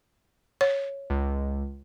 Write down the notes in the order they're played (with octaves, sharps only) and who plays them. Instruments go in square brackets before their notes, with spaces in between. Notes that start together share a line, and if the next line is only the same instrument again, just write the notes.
[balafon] C#5
[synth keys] C#2